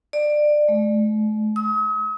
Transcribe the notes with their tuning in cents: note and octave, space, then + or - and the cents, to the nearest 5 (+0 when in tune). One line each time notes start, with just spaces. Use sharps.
D5 +20
A3 -45
D#6 +45